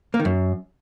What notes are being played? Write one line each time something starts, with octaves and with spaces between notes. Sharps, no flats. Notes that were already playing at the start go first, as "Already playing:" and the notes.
A#3
D#3
F#2